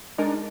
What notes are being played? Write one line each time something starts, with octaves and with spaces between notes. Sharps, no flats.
G#3 D4 D#4 A#4